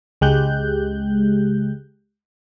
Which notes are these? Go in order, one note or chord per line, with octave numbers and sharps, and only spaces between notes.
C#2 G#3 G4 F#6 G6